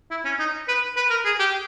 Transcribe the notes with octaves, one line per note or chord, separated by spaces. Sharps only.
E4
C#4
D#4
B4
B4
A#4
G#4
G4